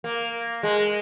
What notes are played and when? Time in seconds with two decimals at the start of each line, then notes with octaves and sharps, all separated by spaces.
0.04 A#3
0.63 G#3